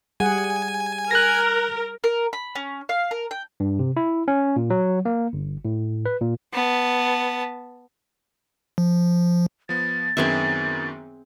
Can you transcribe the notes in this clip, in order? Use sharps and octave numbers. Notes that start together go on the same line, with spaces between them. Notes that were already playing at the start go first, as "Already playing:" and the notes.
G3 G#4 F#5 G#5
A#4 F#6 A#6
A#4
B5
C#4
F5
A#4
G5
G2
C3
E4
C#4
A#2
F#3
A#3
G1
A2
B4
A#2
B3 A5
F3
F3 B3 A6
F#2 D#3 B3 C4 G#4 E5